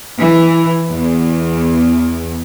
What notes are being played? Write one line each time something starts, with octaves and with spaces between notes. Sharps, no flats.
E3
E2